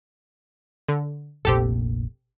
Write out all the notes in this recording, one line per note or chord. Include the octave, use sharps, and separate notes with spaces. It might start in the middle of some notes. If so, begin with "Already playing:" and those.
D3
F1 A#1 A#2 C4 G4 A4